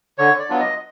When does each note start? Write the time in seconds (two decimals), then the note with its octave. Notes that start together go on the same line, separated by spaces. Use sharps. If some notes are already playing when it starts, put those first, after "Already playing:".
0.18 D3 C#5
0.39 D5
0.49 F#3 B3 D4 F4
0.60 D#5